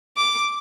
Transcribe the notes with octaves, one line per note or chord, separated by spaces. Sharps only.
D6